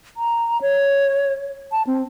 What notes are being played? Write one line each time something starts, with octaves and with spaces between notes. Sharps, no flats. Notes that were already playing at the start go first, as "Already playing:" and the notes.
A#5
C#5
A5
C4